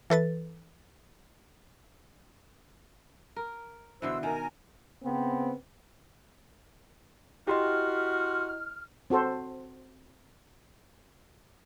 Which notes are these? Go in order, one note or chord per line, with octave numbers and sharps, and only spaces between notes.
E3 A4 B4 A6
A#4
B2 D3 E3 C5 E6
D#3 A#4 G#5
C#3 B3 C4
E4 F#4 G4 D#5 C6 F6
C4 F#4 A4 C5